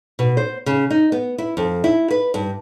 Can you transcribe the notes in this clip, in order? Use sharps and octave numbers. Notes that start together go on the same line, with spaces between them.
B2
C5
C#3
D#4
B3
E4
F2
E4
B4
G2